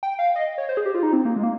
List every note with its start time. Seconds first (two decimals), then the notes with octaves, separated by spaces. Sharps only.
0.03 G5
0.19 F5
0.36 D#5
0.58 C#5
0.69 C5
0.77 G#4
0.85 G4
0.94 F4
1.03 D#4
1.13 C4
1.25 A#3
1.36 G#3
1.43 A#3